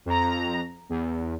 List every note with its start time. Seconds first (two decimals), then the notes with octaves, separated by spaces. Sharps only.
0.06 F2 A#5
0.89 E2